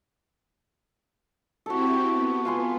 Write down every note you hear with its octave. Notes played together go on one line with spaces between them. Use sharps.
C4 E4 F#4 G4 A4
B3
F4 G#5 C6